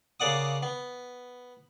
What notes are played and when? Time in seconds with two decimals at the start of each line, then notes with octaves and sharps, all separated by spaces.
0.20 C#3 A#3 D5 F#5 D#6
0.63 B3